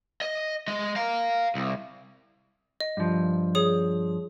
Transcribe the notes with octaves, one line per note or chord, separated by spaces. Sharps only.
D#5
G#3 D#5
F5 A#5
C2
D#5
G2 F3
G#4 C#5 D#6